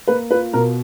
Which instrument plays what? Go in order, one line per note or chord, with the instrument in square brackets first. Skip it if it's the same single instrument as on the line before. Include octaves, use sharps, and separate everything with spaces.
[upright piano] A#3 B4
F4 B4
B2 A#4